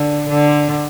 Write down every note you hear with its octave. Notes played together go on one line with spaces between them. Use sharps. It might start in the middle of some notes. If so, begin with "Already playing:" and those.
Already playing: D3
D3